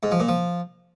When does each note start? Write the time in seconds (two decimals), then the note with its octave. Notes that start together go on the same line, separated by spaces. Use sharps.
0.03 G#2
0.11 F3
0.20 A#2
0.28 F3